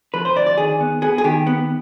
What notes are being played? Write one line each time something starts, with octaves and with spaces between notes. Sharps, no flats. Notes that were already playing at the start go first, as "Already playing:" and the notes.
F3 B4
C5
D2 D5
D5
D#3 G#4
B3
B3 G#4
G#4
D#3 G4
B3